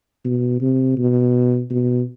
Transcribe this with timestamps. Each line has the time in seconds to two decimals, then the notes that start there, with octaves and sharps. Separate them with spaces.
0.25 B2
0.61 C3
0.98 B2
1.70 B2